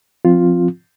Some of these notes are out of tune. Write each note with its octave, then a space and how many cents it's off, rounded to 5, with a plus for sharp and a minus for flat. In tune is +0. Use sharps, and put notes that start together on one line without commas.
F3 +0 C4 +0 F4 +0